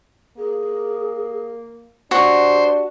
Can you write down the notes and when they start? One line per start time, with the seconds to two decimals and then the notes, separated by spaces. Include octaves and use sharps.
0.38 A#3 G#4
2.11 D4 F#4 G4 C5